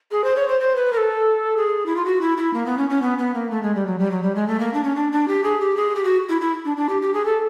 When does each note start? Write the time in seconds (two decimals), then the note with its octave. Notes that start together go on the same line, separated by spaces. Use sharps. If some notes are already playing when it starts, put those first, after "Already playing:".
0.11 G#4
0.24 C5
0.36 C#5
0.48 C5
0.60 C5
0.76 B4
0.93 A#4
0.97 A4
1.57 G#4
1.86 E4
1.96 F4
2.05 F#4
2.21 E4
2.37 E4
2.53 A#3
2.66 B3
2.78 C#4
2.90 C#4
3.02 B3
3.18 B3
3.34 A#3
3.51 A3
3.63 G#3
3.75 G3
3.87 F#3
3.99 G3
4.11 F#3
4.23 G3
4.35 G#3
4.47 A3
4.59 A#3
4.74 D4
4.84 C#4
4.96 D4
5.12 D4
5.28 G4
5.44 G#4
5.60 G4
5.76 G#4
5.96 G4
6.04 F#4
6.29 E4
6.41 E4
6.65 D4
6.77 D4
6.89 G4
7.02 G4
7.14 G#4
7.25 A4